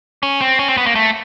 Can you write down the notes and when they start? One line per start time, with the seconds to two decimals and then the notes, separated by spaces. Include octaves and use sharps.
0.23 C#4
0.41 C4
0.59 C#4
0.68 C4
0.77 B3
0.86 A#3
0.95 A3